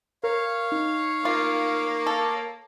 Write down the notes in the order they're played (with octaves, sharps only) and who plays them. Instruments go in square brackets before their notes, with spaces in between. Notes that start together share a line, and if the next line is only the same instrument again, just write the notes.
[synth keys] A#4 [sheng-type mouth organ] C#5 F5
[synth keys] D#4
[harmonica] A#3 D6 [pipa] F4
[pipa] A4